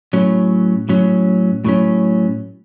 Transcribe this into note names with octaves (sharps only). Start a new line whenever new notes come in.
A2 F#3 C#4
A2 F#3 C#4
A2 F#3 C#4